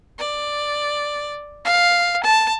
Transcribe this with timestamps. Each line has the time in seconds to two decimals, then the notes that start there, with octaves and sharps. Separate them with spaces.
0.19 D5
1.65 F5
2.24 A5